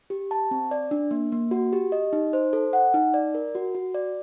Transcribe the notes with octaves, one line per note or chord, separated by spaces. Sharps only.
G4
A5
C4
D5
D4
A#3
A#3
F#4
G4
D#5
D#4
C5
A4
F#5
D#4
D5
A#4
F#4
F#4
D5